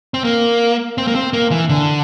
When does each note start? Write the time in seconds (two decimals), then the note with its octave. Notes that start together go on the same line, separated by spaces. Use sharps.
0.14 C4
0.24 A#3
0.98 C4
1.08 A#3
1.15 C4
1.33 A#3
1.51 E3
1.69 D3